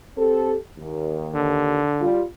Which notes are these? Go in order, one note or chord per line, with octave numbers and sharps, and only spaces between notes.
C4 G4 A4
D#2
D3
G3 F4